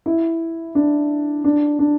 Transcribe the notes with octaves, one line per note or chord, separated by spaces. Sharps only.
E4
D4
D4
D4